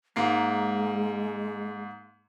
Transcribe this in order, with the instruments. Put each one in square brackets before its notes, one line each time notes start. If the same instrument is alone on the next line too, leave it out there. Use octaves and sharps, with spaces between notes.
[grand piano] G#2 A#3 C7 [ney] G#3